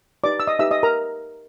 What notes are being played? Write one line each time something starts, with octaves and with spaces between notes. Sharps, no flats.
D#4 G4 B4 D5 D6
E6
D#5 D#6
D#4 G4 B4 E5 E6
D#5 D#6
A#4 A#5